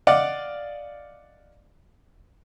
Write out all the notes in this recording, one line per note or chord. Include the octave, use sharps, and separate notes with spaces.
D5 D#5 F5 F#5 D6